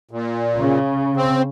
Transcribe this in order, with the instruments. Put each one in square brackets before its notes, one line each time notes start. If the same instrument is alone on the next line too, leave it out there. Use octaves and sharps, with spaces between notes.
[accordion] A#2
[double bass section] C#3
[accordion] C4